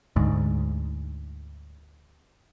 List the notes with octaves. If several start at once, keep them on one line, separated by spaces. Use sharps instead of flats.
D2 G#2